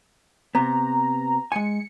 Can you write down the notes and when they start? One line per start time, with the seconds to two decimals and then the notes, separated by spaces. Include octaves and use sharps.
0.55 C3 B3 A#5
1.52 G#3 G#5 C#7